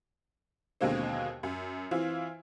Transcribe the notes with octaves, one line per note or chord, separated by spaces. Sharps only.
D#2 B2 D3 G#3 A#3 C4
F#2
E3 C4 E4 F4